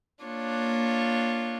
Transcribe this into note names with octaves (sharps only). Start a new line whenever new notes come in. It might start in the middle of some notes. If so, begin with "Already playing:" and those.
A#3 D4 F4 C#5